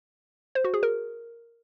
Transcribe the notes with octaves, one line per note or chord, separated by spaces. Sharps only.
C5
F#4
G#4
A#4